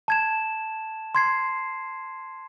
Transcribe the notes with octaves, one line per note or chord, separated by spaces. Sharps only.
A5 G#6 E7
C6 G#6 C7